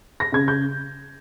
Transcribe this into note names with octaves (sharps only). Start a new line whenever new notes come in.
A#6
C#3 G#6
G6